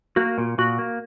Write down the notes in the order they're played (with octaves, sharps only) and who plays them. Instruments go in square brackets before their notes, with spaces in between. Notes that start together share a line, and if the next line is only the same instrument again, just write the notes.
[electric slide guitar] A#3 [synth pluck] F#4
[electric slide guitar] A#2
[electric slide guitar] A#2 [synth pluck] F#4
[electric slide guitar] A#3